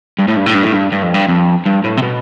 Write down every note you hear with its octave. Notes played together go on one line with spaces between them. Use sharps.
G2
A2
G2
A2
G2
A2
G2
G2
F2
G2
F2
G2
A2
C3
B2